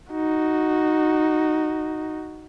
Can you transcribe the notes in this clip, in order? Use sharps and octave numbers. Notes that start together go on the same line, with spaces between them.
D#4 F#4